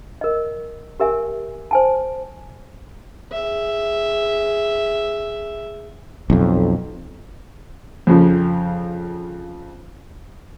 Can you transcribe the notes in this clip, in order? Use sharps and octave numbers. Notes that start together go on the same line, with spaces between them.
A#4 D#5
G4 A#4 E5 G#5
C5 G#5 A5
G#4 E5
B1 F2
F2 C#3 F3